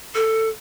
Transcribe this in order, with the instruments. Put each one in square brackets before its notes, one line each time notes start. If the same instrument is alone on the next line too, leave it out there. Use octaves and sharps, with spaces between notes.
[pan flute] A4